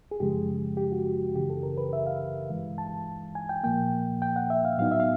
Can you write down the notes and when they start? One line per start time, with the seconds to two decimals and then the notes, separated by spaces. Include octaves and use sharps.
0.11 G#4
0.20 F#2 C#3 F3 G#3 G4
0.77 G4
0.92 F#4
1.06 G4
1.35 F#2 C#3 E3 G4
1.50 A4
1.63 A#4
1.78 B4
1.93 E5
2.07 F5
2.50 G2 E3 G#3
2.78 A5
3.35 G#5
3.49 G5
3.64 A#2 F3 A#3 G5
4.22 G5
4.36 F#5
4.50 E5
4.65 F5
4.78 A2 F#3 B3 D#4 F5
4.92 E5
5.00 F5